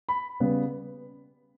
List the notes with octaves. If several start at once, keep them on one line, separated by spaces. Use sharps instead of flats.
B5
C#3 G3 B3